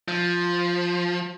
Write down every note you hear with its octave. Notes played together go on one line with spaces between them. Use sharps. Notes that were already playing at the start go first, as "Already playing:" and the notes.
F3